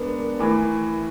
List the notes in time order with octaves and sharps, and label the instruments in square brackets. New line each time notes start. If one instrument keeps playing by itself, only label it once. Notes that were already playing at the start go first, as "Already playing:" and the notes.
Already playing: [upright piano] G#3 B3 D4 [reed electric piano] A#4
[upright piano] A2 E3 [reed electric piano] A#4